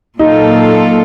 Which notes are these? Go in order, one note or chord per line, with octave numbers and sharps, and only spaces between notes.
A#2 F#3 A#3 D#4 F4 A4